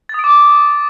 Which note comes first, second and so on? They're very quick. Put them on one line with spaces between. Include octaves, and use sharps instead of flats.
A6 D#6 D7 D6